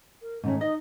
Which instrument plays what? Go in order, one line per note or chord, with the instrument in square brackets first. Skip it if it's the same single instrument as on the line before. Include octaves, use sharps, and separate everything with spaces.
[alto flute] A#4
[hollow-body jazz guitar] G#2 D#3 A3 [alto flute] C#4
[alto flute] D#4 [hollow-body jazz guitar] D#5